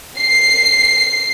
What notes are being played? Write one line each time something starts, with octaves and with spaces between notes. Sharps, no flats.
C7